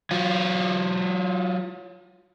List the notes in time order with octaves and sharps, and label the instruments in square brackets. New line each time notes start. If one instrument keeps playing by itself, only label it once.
[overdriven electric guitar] F#3 F4